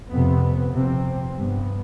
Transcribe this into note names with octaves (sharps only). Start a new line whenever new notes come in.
F2 C3 B3
F2 C3 C4
G2 B3